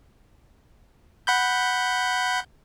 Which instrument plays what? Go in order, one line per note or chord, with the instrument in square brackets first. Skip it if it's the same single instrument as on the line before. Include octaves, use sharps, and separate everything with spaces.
[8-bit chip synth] F#5 B5 G6